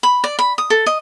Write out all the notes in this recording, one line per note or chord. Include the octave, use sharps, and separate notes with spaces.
B5
D5
B5
D#6
A4
D#5